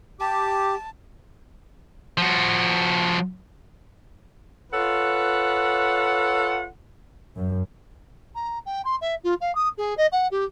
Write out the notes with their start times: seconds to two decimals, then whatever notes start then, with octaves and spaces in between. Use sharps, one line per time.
0.20 G4 A5
2.18 F3 F#4
4.72 F4 A4 B4 C#5 F#5
7.37 F#2
8.35 A#5
8.66 G5
8.85 C6
9.01 E5
9.24 F4
9.41 F5
9.55 D#6
9.78 G#4
9.97 D#5
10.12 F#5
10.31 G4